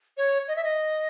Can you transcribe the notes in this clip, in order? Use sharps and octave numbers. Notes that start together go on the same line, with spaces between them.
C#5
D#5
E5
D#5